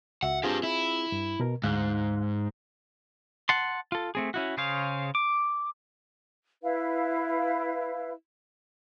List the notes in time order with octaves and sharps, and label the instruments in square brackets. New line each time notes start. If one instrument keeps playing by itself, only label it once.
[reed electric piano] C#2 F#4 E5 [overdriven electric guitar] F#5
[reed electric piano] C4 F4 G#4 [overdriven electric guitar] D4 G4
[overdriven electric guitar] E4
[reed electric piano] G2
B2 A#4
[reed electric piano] D2 F5 F#6 [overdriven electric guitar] G#2
[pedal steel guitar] F#5 A5 C6
F4 A4
A3 C4 G#4
C#4 E4 F#4
C#3 G#4 C5 C#5 F5
D6
[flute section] E4 B4 F5